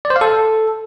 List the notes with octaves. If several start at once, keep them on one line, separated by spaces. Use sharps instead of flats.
D5
C5
F5
A4